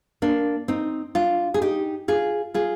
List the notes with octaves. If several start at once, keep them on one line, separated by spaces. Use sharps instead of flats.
A#3 D4
C4 D#4
D4 F4
G#4
D#4 G4
F4 G#4
F4 G#4